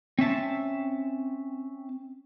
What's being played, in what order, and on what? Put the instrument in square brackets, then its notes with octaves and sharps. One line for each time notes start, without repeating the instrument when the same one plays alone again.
[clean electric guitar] C4 C#4 E5 A5